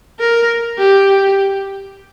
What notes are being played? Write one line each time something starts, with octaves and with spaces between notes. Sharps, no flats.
A#4
G4